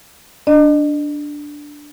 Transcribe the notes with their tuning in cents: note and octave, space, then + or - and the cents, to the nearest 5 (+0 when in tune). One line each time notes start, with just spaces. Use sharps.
D4 +0 D#5 -35